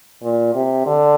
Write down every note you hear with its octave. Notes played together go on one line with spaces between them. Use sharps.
A#2
C3
D3